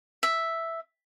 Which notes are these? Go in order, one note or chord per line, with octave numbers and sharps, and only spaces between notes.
E5